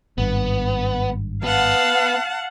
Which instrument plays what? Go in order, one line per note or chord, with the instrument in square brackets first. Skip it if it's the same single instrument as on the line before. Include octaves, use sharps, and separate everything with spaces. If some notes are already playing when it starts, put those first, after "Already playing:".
[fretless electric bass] G#1 G2 [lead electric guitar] B3
[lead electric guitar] B3 [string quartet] F5 F#5 A5